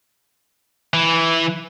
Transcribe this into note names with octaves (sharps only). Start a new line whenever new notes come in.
E3